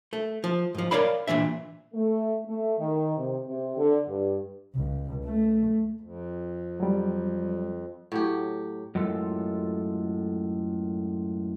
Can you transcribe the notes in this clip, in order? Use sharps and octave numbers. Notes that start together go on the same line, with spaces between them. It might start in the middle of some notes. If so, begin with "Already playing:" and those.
A3
F3
G#2 F3
A#4 C#5 D5 F5 B5
A#2 E3 D4 E5
A3
A3
D#3
C3
C3
D3
G2
C#2
A3
F2
F#3 G3
A2 F#3 G4
F#2 A2 G#3 F4 A4